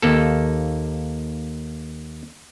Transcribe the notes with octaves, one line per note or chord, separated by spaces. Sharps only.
D#2 A#3 A4